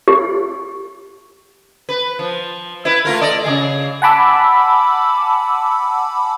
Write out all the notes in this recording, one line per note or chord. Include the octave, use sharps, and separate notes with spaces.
G4
B4
F3
E4 B4
A3 F4 A#4
A4 D5 D#5
C#3 G3 G#4
F#5 G#5 A5 B5 D6 E6